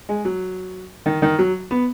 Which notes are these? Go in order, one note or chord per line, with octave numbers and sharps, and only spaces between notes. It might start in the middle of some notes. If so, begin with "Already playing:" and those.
G#3
F#3
D#3
D#3
F#3
B3